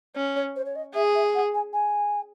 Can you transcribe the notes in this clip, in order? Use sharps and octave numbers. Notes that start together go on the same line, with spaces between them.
C#4
C#5
C5
C#5
D#5
G#4 E5
E5
F#5
G#5
G#5